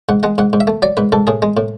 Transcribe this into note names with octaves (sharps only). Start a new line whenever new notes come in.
G#2 F#5
G#3 F#5
G#2 F#5
G#2
E5
A3
F#3 D5
G#2 B4
G#2 A4
A2 G#4
G#3
A2